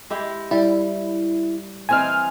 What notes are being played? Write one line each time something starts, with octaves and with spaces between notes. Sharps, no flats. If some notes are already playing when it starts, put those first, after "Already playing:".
G#3 E4 G4
G3 E4
E3 C4 D#4 G#5 F6